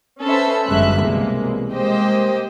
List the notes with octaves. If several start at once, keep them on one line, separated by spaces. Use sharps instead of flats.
C#4 A4 B4 C5 E5
G1 F#2 G#3 C#4 E5 F#6
C2 B2 E3 G#3 A#3
G#3 A#3 G4 C5 D#5 G5